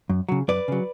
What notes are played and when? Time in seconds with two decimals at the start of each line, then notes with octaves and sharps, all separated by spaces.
0.10 F#2
0.28 C#3 F#3
0.48 F#2 B4 D5
0.68 C#3 F#3